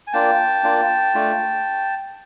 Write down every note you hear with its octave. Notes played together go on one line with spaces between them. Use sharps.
G#5
A#3 D4 F4 G5 A5
A#3 D4 F4
A3 D4 F4